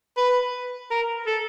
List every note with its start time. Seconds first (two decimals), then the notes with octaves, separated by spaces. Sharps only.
0.17 B4
0.91 A#4
1.27 A4